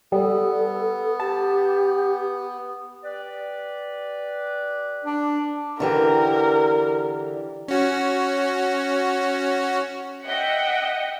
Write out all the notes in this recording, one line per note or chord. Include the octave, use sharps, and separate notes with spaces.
G3 B3 A4
G4 A5
G4 B4 D5
D4
D3 E3 G4 A#4
C#4 F#4
D#5 E5 F#5 G5